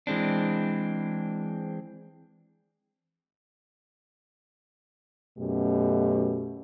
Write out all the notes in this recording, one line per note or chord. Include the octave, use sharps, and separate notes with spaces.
E3 G#3 C4 D4
F#2 B2 A3 G4